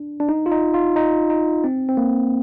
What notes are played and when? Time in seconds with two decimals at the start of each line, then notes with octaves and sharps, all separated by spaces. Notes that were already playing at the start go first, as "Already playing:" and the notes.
Already playing: D4
0.20 D4
0.29 D#4
0.46 F4
0.52 D#4
0.74 F4
0.96 D#4
1.30 D#4
1.64 C4
1.89 C4
1.97 A#3